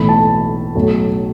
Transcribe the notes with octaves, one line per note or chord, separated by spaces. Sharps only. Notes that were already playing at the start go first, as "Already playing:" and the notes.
Already playing: B1 A2 E3 A3 B5
A5
B1 A2 F#3 A3